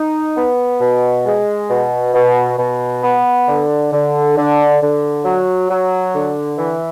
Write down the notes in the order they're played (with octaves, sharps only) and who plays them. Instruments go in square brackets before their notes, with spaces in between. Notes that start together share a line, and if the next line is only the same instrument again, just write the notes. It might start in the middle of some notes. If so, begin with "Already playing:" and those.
Already playing: [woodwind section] D#4
B3
B2
G#3
B2
B2
B2
B3
D3
D3
D3
D3
F#3
F#3
D3
E3